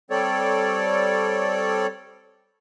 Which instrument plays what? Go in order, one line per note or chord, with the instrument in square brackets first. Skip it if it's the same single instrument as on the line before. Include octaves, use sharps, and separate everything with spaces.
[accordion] G3 C4 A4 C#5 D5